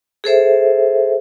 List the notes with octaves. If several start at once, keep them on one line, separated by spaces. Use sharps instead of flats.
G#4 A4 C5 E5